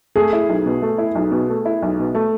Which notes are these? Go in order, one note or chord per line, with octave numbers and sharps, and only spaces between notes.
A3 G#4
E4
B1
B2
A3
E4
B1
B2
A3
E4
B1
B2
A3